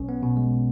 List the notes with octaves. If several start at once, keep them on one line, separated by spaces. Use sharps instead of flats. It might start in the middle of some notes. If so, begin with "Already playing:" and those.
Already playing: B1 C#4
B3
B2
G#3